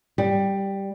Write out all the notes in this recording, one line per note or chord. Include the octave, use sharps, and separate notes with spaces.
G3